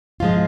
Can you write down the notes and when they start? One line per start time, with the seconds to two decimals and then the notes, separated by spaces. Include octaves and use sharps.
0.20 G#2 F3 G#3 F4